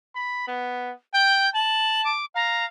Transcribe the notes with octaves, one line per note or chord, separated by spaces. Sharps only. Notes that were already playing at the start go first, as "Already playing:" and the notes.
B5
B3
G5 G6
A5 F#7
D6
F5 A#5